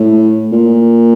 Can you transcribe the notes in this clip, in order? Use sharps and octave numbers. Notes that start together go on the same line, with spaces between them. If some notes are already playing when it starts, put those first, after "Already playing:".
Already playing: A2
A#2